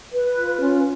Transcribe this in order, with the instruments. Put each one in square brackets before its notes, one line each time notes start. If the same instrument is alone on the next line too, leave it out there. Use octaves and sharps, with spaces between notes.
[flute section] B4
F4
C#4